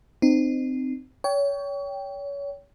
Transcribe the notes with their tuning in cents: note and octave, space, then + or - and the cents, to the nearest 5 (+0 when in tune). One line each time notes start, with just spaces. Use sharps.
C4 -15 D#4 -30
C#5 +30 G5 +0